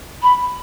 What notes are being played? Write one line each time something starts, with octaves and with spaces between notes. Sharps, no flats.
B5